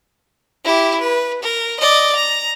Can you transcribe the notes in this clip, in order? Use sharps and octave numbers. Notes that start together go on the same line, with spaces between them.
E4 G4
B4
A#4
D5 D#5
A#5